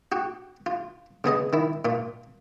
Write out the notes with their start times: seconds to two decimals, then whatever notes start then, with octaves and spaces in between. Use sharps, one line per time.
0.12 F#4 G4
0.66 F4
1.24 C#3 B3 G#4 D#5
1.53 D#3 E4
1.85 A#2 F4